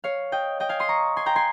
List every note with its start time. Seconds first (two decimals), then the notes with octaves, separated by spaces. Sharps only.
0.04 C#5 F5
0.32 D#5 G5
0.60 D#5 G5
0.69 F5 G#5
0.80 C6 D#6
0.89 A#5 C#6
1.17 G#5 C6
1.26 G5 A#5
1.36 G#5 C6